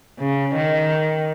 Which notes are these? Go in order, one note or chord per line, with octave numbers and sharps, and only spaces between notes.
C#3
D#3